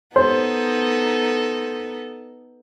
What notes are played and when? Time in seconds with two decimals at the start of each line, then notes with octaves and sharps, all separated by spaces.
0.16 B3 D#4 A4 C5